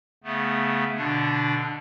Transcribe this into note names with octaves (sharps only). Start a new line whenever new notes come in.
C#3 A3 B3
B2 D3 D4